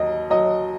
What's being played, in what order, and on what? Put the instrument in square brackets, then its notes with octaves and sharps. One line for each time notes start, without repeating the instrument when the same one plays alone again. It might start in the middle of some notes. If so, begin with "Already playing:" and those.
Already playing: [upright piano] D#2 F#3 D#5
F#3 D#5